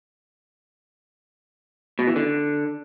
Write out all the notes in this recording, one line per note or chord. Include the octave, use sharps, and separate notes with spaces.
B2
E3
D3